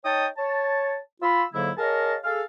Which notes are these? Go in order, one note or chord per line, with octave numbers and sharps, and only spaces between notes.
D#4 C#5 D#5 G5 A5 D#6
C#5 A5
F4 B5 E6
G#2 D3 F#3 A#3 E4
G#4 A#4 C#5 D#5 F5 A5
G#4 A4 F5